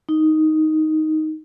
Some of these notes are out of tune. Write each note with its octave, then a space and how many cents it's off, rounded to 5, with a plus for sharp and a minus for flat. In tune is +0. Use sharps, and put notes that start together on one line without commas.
D#4 +5